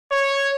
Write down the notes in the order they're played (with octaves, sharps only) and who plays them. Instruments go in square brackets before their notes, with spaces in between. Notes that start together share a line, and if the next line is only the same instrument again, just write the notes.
[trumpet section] C#5